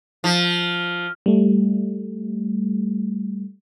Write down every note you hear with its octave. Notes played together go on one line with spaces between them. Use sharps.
F3
G3 A3